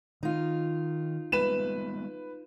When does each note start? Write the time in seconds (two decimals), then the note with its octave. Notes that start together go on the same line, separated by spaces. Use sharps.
0.23 D#3 D#4 F4
1.32 G3 G#3 B3 B4 E7